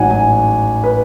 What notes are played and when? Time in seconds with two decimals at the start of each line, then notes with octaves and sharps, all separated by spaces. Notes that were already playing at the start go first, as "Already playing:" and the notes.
Already playing: A1 G#2 F#3 F#5 G#5
0.10 G#5
0.84 B4